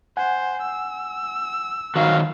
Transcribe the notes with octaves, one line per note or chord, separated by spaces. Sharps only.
C5 F#5 G#5
E6
D#3 F#3 F#4 F5